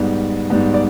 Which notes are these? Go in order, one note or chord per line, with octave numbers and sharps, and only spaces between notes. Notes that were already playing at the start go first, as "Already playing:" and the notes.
Already playing: G#2 G3 B3
G#2 G3 B3
D5